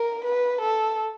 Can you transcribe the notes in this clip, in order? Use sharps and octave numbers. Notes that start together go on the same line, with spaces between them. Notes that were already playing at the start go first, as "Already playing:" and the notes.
Already playing: A#4
B4
A4